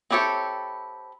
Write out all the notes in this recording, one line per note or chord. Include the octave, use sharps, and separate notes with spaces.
C4 E4 G4 A4 C#5